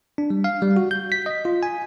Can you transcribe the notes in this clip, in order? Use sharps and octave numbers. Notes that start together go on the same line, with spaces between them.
D4
G3
F5
G3
F#4
G6
B6
D#5
F4
G#5